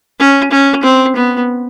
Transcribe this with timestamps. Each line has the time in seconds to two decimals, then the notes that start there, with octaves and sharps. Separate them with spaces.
0.20 C#4
0.52 C#4
0.83 C4
1.16 B3